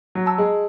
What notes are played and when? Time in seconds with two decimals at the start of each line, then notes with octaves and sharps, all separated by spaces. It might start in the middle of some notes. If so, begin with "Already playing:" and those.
0.15 F#3
0.26 A5 E6
0.38 G#3